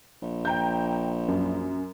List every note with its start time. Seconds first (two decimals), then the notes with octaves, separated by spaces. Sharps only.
0.22 A#1
0.45 G5 A#5 G6
1.28 F#2